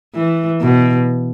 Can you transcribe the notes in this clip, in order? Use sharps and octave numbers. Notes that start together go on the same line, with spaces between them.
E3
B2